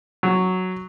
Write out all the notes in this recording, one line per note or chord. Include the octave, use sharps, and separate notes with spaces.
F#3